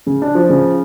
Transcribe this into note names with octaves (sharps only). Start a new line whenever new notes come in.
C#3
D4
F3
C#3